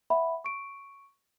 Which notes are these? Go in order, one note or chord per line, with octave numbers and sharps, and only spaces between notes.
E5 F#5 B5
C#6 D7